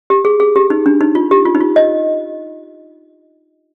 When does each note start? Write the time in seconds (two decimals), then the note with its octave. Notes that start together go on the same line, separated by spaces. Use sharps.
0.10 G4
0.25 G#4
0.40 G#4
0.56 G4
0.70 D#4
0.86 D4
1.01 D#4
1.15 F4
1.31 G4
1.45 F4
1.55 D#4
1.61 F4
1.76 D#5